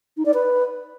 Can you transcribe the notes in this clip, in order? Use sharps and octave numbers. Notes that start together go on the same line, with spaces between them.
D#4
D5
B4